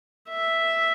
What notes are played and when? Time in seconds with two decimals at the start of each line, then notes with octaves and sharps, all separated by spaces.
0.29 E5